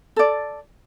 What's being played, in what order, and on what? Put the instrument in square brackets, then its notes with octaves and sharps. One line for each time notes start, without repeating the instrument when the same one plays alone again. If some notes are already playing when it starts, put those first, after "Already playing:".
[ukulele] A4 D5